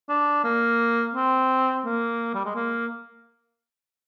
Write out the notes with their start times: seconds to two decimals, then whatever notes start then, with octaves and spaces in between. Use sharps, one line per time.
0.09 D4
0.44 A#3
1.15 C4
1.85 A#3
2.34 G3
2.45 G#3
2.55 A#3